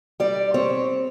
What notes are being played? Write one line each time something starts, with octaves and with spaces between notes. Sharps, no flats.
G3 D5
C4 C#5